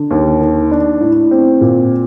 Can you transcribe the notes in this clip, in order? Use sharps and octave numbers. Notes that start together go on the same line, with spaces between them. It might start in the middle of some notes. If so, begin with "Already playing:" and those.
Already playing: D3
D#2
D#3
D4
A2
C4
A#2